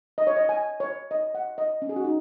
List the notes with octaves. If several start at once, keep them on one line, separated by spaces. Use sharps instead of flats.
D#5
C#5
D#5
G#5
C#5
D#5
F#5
D#5
C#4
G#4
F#4
D#4